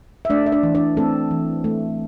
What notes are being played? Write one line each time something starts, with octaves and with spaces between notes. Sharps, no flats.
E5
A3 D4 D5
E5
D4 D5
E3
D4 D5
A3 C4 A4
E3
A3